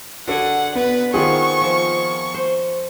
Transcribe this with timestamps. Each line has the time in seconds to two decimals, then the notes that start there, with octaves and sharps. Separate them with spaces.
0.28 D3 F#4 G#4 A4 F#5
0.76 B3 B4
1.14 D#3 B3 C4 F4 G#4 C#6
1.61 F3
2.34 C5